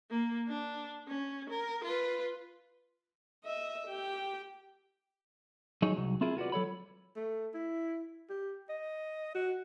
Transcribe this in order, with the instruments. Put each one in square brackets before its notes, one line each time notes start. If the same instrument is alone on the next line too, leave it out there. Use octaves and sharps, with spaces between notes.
[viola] A#3
D4
C#4
A#4
F4 B4
D#5 E5
G4 G5
[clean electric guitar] F#3 D#4 G#4 C#5
C2 F#3
C4 E4 F4 G#4 A#4
F4 F#4 B4 D5
F#3 A4 C#5 B5
[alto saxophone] A3
E4
G4
D#5
F#4